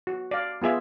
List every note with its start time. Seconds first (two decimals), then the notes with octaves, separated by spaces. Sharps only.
0.07 F#4
0.31 D5 F5
0.62 B3 F4 G#4 E5